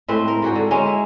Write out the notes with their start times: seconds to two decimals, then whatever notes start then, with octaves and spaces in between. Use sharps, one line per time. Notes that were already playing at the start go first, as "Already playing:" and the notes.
0.08 A2 G#3 C4 B4
0.28 A#4
0.42 G#2 F#4 G#4 G5
0.55 D3
0.71 G#3 A#3 C#4 D#5
0.86 E4